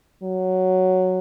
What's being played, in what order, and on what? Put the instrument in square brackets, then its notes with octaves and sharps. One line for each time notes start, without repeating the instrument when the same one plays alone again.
[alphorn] F#3